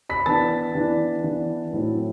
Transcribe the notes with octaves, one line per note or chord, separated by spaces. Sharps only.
B5 B6
E3 B3 D4 A5 A6
E3 B3 D4
E3 B3 D4
A2 F#3 C4 E4